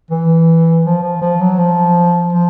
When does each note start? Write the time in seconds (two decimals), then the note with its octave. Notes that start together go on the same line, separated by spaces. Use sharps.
0.10 E3
0.85 F3
1.02 F3
1.21 F3
1.40 F#3
1.58 F3
2.33 F3